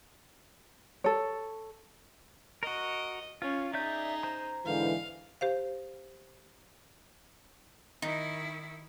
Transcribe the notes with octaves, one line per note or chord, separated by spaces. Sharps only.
A4 C#5
F#4 A#4 D#5
C#4 F4
D#4 G#4 D5 E5 G6
C5 A#5
G#2 D3 E3 F5
G4 C5 F5
D#3 D#4 E4